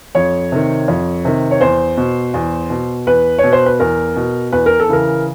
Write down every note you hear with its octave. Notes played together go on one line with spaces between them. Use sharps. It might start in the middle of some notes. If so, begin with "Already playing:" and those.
F2 C#5
C3 D#3
F2
C3 D#3
C#5
E2 C5
B2
E2
B2
E2 B4
C#5
B2
C5
B4
E2 A#4
B2
E2 B4
A#4
A4
C#3 E3 A#4